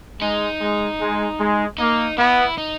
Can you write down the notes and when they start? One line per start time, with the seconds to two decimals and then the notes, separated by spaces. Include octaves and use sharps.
0.21 G#3 D#4
0.60 G#3
1.00 G#3
1.40 G#3
1.78 A#3 D#4
2.18 B3 E4
2.58 D#4